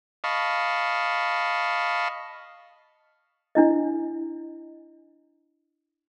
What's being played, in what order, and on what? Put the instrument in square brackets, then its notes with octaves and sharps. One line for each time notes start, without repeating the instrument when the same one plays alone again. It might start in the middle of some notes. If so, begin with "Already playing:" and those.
[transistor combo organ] D#5 F5 A5 B5 C#6
[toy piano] D4 E4 D#5